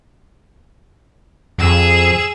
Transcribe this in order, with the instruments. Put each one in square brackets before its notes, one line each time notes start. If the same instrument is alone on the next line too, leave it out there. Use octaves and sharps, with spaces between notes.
[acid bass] F2 [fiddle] G#4 E6